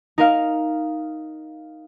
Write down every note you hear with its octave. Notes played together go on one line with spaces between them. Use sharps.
D#4 A#4 F5